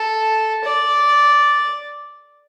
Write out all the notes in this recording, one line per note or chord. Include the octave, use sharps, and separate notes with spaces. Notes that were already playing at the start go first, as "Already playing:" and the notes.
Already playing: A4
D5